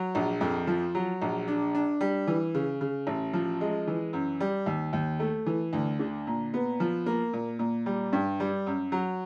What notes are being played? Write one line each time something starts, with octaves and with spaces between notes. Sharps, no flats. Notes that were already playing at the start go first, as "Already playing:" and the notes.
Already playing: F#3
A#1
F2
F3
F#3
A#1
D4
D4
G3
E3
C#3
C#3
A1
F3
G#3
E3
F#2
G3
D#2
D#2
A3
E3
D2
D3
A#2
B3
F3
A#3
A#2
A#2
G3
G2
G3
F#2
F#3